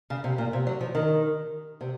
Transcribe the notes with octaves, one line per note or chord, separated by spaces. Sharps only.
C#3
C3
A#2
C3
F#3
F3
D#3
C3